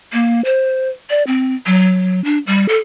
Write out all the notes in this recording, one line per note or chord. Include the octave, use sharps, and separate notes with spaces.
A#3
C5
D5
C4
F#3
D4
G3
A4